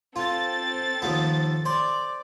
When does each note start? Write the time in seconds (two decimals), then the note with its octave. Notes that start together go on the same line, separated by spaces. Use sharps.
0.16 C4 F4 A4 A6
1.02 D#2 F3 B3
1.65 C5 D5